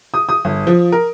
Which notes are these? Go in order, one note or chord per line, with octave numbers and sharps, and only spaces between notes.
D#6
D#6
G1
F3
A#4